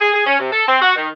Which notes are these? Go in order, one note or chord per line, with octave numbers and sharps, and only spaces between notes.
G#4
G#4
C#4
C3
A4
C4
F#4
D#3